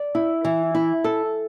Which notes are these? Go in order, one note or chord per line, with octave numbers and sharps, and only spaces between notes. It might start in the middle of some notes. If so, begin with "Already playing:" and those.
Already playing: D5
E4
E3
E4
A4